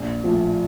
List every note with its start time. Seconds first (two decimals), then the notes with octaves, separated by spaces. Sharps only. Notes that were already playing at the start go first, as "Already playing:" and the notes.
Already playing: A#1
0.24 A2 F3